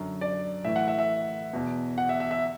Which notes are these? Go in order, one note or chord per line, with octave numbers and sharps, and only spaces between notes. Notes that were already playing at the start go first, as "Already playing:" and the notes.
Already playing: F#2 D3
D5
A2 E3 E5
F#5
E5
E5
E2 B2
F#5
E5
E5
E5